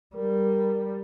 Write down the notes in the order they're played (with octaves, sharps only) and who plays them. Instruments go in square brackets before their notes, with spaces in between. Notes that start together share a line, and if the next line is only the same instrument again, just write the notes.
[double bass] G3 [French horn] A#4